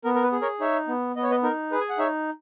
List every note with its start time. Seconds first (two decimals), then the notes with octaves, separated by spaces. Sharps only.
0.04 B3 A#4
0.15 A#4
0.23 B4
0.32 G#4
0.41 A#4 C#5
0.60 D#4 C#5 E5
0.88 B3
1.16 B3 D#5
1.23 C#5
1.31 B4 D#5
1.43 D#4 A#4
1.71 G#4 B4
1.80 G#5
1.89 F#5
1.98 D#4 C#5 E5